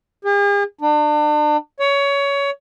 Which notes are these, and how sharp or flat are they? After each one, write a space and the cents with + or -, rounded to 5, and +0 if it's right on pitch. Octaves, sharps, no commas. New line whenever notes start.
G#4 -45
D4 +35
C#5 +20